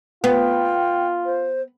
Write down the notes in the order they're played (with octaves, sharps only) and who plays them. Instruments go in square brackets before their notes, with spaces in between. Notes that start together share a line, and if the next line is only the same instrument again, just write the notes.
[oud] B3 [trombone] F4 [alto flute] G5
[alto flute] C5